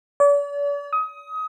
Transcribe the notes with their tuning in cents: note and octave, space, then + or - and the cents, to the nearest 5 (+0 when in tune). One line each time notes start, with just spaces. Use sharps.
D5 -45
D#6 +25